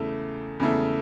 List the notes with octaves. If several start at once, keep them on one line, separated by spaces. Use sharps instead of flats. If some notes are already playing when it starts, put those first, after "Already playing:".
Already playing: E2 C#3 A3 E4
E2 C#3 A3 E4